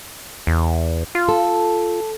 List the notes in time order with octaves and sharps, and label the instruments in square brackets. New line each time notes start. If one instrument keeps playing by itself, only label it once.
[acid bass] E2
F4
[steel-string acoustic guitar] A4